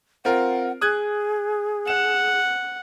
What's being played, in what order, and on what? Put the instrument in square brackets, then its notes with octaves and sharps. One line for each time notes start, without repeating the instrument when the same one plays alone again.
[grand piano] C4 F4 A#4 [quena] F#5
[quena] G#4 [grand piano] D#6 F#6 G#6
[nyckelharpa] F#5 [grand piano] E7